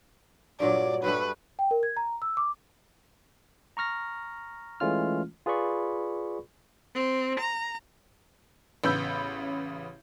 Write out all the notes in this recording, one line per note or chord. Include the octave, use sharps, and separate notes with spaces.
G2 A#2 F#3 D5
G2 G3 A3 B4
G5
A#4
G#6
A#5
E6
D6
A#5 C#6 F6 A#6
E3 G#3 A3 C#4 F4 F6
F4 G#4 B4 D5 B5 C#6
C4
A#5
A1 C#3 B3 B5 E6 G6